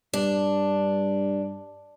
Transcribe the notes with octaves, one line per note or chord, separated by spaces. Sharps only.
G2 D4